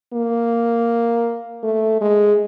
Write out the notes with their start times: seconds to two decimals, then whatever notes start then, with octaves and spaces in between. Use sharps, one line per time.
0.13 A#3
1.63 A3
2.01 G#3